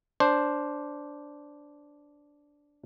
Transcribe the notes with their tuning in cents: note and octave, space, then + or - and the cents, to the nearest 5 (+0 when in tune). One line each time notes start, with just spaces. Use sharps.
D4 -10 C5 +0